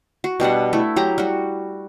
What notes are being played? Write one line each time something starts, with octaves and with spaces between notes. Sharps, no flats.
F#4
B2 G3 D4 F#5
A3 E4
F#3 G4 A#5
G3 F#4